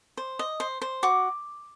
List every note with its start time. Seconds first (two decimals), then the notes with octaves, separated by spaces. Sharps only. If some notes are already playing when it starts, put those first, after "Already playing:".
0.17 C5
0.39 D#5
0.60 C5
0.81 C5
1.03 F#4 D6